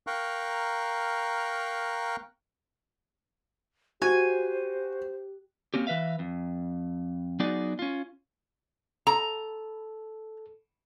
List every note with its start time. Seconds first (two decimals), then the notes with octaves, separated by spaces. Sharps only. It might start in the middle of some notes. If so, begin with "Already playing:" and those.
0.07 A#4 F5 G5 A#5 C#6 F#6
4.02 F#4 G4 C5 G#5
5.74 A#3 C4 C#4 G4
5.87 E3 B4 E5 F5
6.19 F2
7.40 F#3 B3 D#4 F#4 G#4 D5
7.79 C#4 F4
9.07 A4 A#5